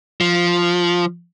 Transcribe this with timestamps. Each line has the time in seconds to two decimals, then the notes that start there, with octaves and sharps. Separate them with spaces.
0.21 F3